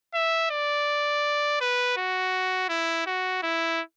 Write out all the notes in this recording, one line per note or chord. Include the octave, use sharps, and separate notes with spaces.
E5
D5
B4
F#4
E4
F#4
E4